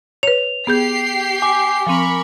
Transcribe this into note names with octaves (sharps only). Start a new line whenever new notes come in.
B4 C#5 F7
B3 G4 G#4 G6 C7
G#5 D6
F3 C4 A#4 B5 C#6